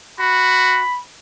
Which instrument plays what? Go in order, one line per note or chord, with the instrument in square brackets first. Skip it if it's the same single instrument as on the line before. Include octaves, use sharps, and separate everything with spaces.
[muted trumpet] F#4 [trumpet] B5